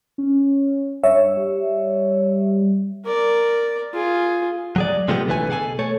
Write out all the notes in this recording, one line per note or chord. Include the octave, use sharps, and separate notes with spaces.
C#4
G2 C#5 E5
G3
A#4 D5
F4 G#4
F#3 G#4 D5
C3 F3 G#3 A3 B3 G4
B1 D3 E3 A3 B4 G#5
B2 G#4 A4 G5 G#5
A3 A4 C#5